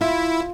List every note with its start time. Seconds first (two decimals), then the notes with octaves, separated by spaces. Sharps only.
0.01 E4 F4